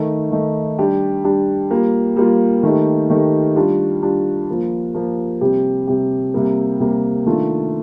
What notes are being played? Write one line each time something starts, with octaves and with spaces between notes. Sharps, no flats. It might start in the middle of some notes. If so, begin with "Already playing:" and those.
Already playing: D#3 A3 D#4
D#3 A3 D#4
G3 D4 G4
G3 D4 G4
G3 A#3 F4
G3 A#3 F4
D#3 A3 D#4 G4
D#3 A3 D#4 G4
G3 D4 F4
G3 D4 F4
F3 A#3 F4
F3 A#3 F4
C3 G3 C4 G4
C3 G3 C4 G4
C3 G3 A#3
C3 G3 A#3
D#3 A3 D4 F4